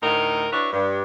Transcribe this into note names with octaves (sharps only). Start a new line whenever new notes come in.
D2 A2 D#4 A#4
D4 E4 F#4 B4 C#5
G2